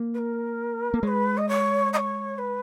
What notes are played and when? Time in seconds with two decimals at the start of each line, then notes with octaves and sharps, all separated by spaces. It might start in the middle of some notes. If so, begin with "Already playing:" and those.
Already playing: A#3
0.14 B4
0.18 A#4
0.94 A#3
1.03 G#3 C#5
1.07 B4
1.37 D#5
1.48 C#5
1.93 D#5
1.96 C#5
2.38 B4